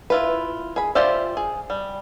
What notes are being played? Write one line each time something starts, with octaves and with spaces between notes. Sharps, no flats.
E4 F4 B4
G#4 B5
F4 G4 C5 D5 E5
G#4
G3